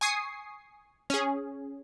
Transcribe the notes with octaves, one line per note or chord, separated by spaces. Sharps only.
G#5 C#6 D#6 C7
C#4 G#4